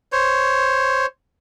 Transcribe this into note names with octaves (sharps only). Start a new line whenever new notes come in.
C5 C#5